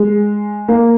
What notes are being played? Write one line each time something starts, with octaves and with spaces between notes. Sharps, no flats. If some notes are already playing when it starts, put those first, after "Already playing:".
Already playing: G#3
A#3